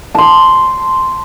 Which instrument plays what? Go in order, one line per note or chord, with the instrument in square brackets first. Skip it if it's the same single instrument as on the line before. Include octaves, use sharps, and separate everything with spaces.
[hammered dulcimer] A5 C6